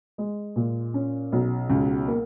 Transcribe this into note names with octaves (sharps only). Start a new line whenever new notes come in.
G#3
A#2
C#4
B1
C#2
A#3